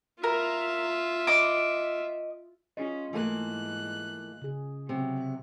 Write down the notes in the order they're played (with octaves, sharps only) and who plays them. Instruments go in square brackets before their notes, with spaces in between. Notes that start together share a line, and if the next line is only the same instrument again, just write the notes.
[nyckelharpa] F4 E5 [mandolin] A#4
[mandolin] D#5 D6
[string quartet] C#4 [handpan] F4 G#4 D#5
[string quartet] G#2 F#6 [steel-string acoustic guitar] E3 A3 A#3
[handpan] C#3 G#4
[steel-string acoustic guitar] C3 [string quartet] F#3